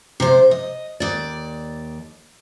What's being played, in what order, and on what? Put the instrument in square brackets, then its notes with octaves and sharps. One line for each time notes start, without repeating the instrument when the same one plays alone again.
[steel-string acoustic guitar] C3 C5
D#5
D#2 D5